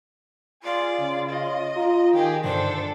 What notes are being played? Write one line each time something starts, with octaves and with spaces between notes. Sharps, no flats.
F4 G#4 D5
C#3
D#5
F4 A#5
D#3 G4 G#4 G5
G2 D3 D4 A4 C5